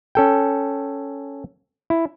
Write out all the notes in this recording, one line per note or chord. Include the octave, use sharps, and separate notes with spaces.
C#4 A4 G5
E4